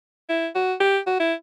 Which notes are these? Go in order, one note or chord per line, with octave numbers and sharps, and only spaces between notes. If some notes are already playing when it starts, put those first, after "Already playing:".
E4
F#4
G4
F#4
E4